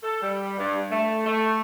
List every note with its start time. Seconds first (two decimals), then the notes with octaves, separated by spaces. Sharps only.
0.03 A4
0.22 G3
0.58 G2
0.91 A3
1.26 A3